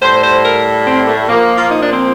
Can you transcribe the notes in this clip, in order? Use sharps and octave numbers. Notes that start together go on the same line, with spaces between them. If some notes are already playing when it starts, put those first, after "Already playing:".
A2 G3 C5
C5
A#4
C4
A#3
A3
A#2 F3 A#3
F4
D#4
D4
C4